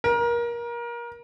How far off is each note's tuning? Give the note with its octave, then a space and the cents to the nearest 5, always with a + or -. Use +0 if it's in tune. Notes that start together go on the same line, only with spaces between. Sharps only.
A#4 +25